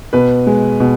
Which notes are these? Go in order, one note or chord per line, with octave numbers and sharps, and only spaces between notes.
B2 B4
G#3
B2